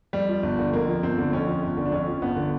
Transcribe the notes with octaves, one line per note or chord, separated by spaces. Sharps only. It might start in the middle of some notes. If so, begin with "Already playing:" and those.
F2 G3
F3
G1
D3
F2 A#3
F3
G1 C4
D3
F2 C#4
F3
G1
D3
D4
F2 C#4
F3
G1 B3
D3